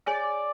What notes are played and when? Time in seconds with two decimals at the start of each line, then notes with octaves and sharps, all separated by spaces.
0.06 G#4 C#5 D5 G#5